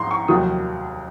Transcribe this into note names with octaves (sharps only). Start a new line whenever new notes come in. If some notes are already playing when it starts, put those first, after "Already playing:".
Already playing: G#1 G#2 A#5 C6
C#6
F1 D#2 D#3 F#3 D#6